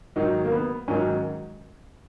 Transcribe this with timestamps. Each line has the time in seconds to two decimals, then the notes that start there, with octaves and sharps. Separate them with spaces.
0.16 G#2 D#3 F#3 D#4
0.44 A#3
0.52 B3
0.88 G#2 D#3 F#3 C#4